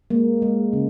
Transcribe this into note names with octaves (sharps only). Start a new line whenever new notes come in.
G#3 A#3
G#3
C#3